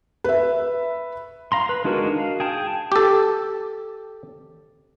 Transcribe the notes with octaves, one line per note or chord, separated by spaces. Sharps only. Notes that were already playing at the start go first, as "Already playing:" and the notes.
B4 E5
F5 A#5 C6
B4
G#3 D4 D#4 F#4 A#4
F5
G#4 G5 A5
G4 A4